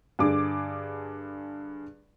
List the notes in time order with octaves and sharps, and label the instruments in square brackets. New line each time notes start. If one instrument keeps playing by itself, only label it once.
[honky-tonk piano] G2 D3 G#4 D6